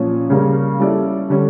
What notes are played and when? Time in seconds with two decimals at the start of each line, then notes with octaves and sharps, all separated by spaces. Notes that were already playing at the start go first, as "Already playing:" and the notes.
Already playing: A#2 F3 C#4
0.30 C#3 G3 A#3 C#4
0.80 G3 C#4 E4 A4 D5
1.30 D3 G3 C#4